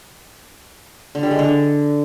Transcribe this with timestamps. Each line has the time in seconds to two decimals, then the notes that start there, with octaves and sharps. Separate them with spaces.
1.15 D3
1.23 G3
1.31 G#3
1.39 D3